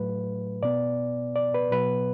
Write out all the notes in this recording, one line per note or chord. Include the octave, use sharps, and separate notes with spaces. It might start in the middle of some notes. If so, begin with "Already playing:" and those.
Already playing: A2 F#3 A3 B4
B2 B3 D5
D5
B4
B2 F#3 B3 B4